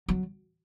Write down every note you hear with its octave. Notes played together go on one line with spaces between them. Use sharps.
F#3